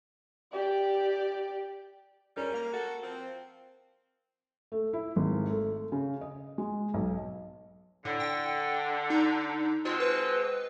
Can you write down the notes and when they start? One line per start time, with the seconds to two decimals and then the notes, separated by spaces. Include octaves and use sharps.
0.52 G4 D5
2.37 G3 C#4 A#4
2.54 A#3
2.73 F#4 A4
3.03 F3 C4
4.72 A3
4.93 E4
5.16 G#1
5.50 A3
5.92 C#3
6.21 D#5
6.58 G#3
6.94 B1
8.05 A2 D3
8.20 G5
9.10 D#4
9.85 B2 G#3 C4 F4
10.00 B4